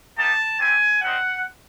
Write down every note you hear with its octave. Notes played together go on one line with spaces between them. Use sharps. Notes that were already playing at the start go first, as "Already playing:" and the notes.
A#3 D#4 G4 A5
C4 E4 G4 G#5
G3 C4 D#4 F#5